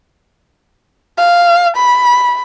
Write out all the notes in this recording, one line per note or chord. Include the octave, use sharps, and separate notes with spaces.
F5
B5